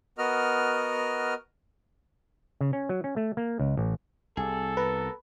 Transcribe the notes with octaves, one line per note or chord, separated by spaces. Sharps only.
B3 F#4 A#4 D#5 F6
C#3
C#4
F#3
C#4
A3
A#3
C#2
A1
C2 G#4 A4
B3 A#4 B4